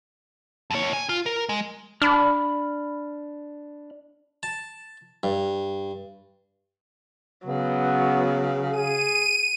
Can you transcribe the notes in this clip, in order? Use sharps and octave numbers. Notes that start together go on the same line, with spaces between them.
F2 C#5
G#5
F4
A#4
G#3
D4 B5 F6
A5
G2
C#3 F#3 B3
G#4 D#7